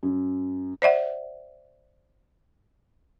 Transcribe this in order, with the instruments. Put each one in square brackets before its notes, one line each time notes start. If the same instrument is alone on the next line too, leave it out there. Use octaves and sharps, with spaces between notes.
[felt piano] F#2
[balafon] C5 D5 E5 F#5